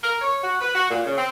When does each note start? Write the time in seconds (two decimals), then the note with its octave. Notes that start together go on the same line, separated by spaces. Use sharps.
0.03 A#4
0.21 C#5
0.44 F#4
0.61 B4
0.75 F#4
0.90 A#2
1.04 C#3
1.17 C4